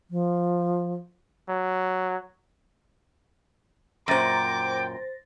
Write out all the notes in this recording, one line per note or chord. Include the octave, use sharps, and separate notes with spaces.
F3
F#3
F#2 A#2 C5 G5 D6 A6 A#6